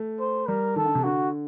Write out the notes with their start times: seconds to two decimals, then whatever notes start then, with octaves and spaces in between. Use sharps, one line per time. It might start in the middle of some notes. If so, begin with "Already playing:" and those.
Already playing: A3
0.20 C5
0.48 G3 A#4
0.76 D#3 A4
0.85 D3
0.95 C3
1.04 D3 F#4